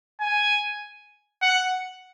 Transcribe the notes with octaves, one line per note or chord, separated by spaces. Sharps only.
G#5
F#5